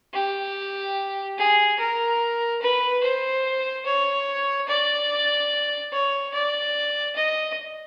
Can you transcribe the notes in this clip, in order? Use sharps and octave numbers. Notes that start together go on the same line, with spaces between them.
G4
G#4
A#4
B4
C5
C#5
D5
C#5
D5
D#5